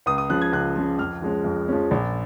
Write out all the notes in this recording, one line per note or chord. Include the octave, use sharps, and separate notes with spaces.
C#2 D#6
D#6
C#3 F3 F#6
G#6
C#2 F#6
C#3 F3
F2 F6
F3 G#3 C#4
F2
F3 G#3 C#4
A#1